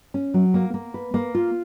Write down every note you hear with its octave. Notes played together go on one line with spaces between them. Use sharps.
C#4
F#3
A#3
A#3
B4
A#3
F4